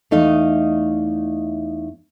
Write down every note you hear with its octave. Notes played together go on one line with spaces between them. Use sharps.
E2 A3 D#4 D#5 F5